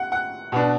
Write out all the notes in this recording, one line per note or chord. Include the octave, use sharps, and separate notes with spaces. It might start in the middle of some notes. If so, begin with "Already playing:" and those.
Already playing: F#5
F#5
B2 B3 D4